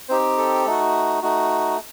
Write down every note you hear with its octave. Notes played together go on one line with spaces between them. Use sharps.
C4 D#4 G4 C5
A4
A3 D#4 F#4
A3 D#4 F#4